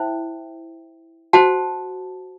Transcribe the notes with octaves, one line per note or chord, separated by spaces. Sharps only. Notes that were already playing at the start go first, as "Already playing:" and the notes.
Already playing: E4 C5 E5 G5
F#4 C5 F#5 A5